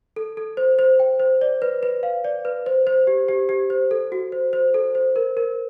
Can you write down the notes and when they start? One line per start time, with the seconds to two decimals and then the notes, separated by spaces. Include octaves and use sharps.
0.16 A4
0.37 A4
0.57 C5
0.79 C5
1.00 G5
1.20 C5
1.41 D5
1.62 B4
1.83 B4
2.03 F5
2.24 D5
2.45 B4
2.66 C5
2.87 C5
3.07 G4
3.29 G4
3.49 G4
3.70 C5
3.91 A4
4.12 F#4
4.32 C5
4.53 C5
4.74 A4
4.95 C5
5.16 A#4
5.37 A#4